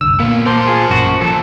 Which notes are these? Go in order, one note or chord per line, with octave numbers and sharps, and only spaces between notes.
F#1 C2 D3 E6
A#2 A#3 B3 C#4
A#3 A#4 C5 F#5 A5 C6
F4 G#4
A1 F#2 A#2 F#4
A#2 F3 F#3 A4